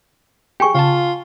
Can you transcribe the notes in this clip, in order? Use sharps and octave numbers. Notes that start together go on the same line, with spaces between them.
G4 G#4 G5 G#5 C#6
C#3 F4 F5 A5